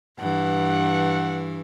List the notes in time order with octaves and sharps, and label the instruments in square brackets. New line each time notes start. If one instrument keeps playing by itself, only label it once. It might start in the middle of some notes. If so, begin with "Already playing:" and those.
[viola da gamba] G2 E3 [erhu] F#5